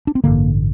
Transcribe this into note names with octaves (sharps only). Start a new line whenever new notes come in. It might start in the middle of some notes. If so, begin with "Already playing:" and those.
D4
C4
A1 G2 D3 A#3